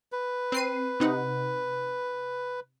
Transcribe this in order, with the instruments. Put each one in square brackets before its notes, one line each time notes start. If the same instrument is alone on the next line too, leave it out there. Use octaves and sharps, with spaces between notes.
[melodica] B4
[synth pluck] C4 C7 D#7
C3 D#4 F#5